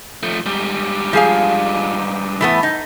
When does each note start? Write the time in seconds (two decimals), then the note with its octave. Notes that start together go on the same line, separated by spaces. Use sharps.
0.23 F3 A3
0.46 G#2 G3
1.13 F3 G#4 F5
2.41 E3 A3 B3
2.63 D#4